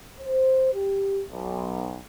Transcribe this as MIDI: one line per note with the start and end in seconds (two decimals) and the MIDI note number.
0.20 0.70 72
0.73 1.22 67
1.28 1.99 35